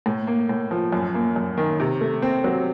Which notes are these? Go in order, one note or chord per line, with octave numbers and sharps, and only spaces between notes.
A2
A#3
A2
F3
F#2
A#3
F#2
D#3
C3
A3
C4
F#3